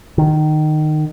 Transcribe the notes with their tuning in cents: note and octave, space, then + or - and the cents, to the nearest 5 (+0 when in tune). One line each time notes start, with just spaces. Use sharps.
D#3 -20